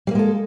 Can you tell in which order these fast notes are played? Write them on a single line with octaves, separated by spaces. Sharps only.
G3 A#3 G#3 A4